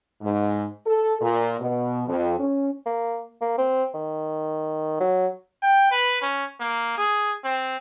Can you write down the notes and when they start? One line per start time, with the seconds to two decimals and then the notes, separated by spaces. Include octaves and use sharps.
0.22 G#2
0.86 A4
1.20 A#2
1.60 B2
2.07 F2
2.39 C#4
2.86 A#3
3.41 A#3
3.58 C4
3.94 D#3
5.00 F#3
5.63 G5
5.91 B4
6.22 C#4
6.60 A#3
6.98 G#4
7.44 C4